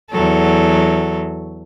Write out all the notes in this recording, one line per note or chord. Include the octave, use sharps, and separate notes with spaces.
E2 F#3 A4